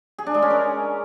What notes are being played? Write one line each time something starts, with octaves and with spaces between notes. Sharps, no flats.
G#4
D4
G#3
C#4
A#4